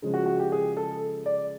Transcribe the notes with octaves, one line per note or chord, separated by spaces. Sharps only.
C#3 F3 G#3
F#4
F#4
G4
G#4
A4
D5